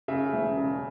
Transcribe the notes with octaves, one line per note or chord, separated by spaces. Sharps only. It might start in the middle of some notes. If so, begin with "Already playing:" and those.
C#3 E5
E1
C#3